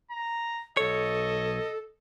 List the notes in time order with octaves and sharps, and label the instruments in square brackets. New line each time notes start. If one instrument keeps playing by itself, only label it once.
[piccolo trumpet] A#5
[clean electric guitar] B1 C#5 [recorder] A4 [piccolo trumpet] D#5